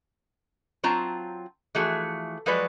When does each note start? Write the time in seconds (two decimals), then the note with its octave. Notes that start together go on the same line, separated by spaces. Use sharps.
0.83 F#3 C4 F4 A5 A#5
1.75 E3 F3 A3 F#4 G#4
2.46 F3 F#3 G#3 F#4 B4 D5